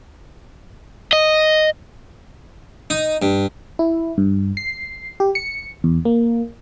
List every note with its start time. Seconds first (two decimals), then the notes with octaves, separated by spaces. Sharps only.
1.13 D#5
2.90 D#4
3.22 G2
3.79 E4
4.18 G2
4.57 C7
5.20 G4
5.35 C#7
5.84 E2
6.05 A#3